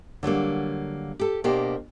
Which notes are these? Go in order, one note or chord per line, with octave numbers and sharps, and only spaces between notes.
D3 F#3 G3 A#3
G4 A4
B2 A#3 D4 G4 C5